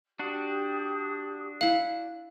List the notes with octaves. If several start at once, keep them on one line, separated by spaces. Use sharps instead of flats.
D4 F#4 G4 D#6
E4 F5 F#5